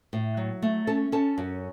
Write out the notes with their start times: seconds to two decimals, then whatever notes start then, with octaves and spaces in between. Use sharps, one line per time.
0.13 A2
0.37 F#3
0.62 A3
0.87 C#4 A4 A5
1.12 C#4 A4 A5
1.38 F#2